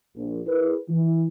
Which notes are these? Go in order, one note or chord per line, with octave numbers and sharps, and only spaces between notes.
A#1
E4 G#4 A#4 B4
E3